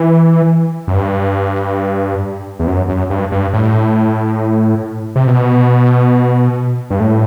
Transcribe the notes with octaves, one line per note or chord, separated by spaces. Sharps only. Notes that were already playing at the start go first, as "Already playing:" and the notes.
Already playing: E3
F#2
G2
E2
F#2
F#2
G2
G2
A2
C3
B2
G2
A2